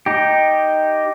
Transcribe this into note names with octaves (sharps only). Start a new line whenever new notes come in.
D#4 G4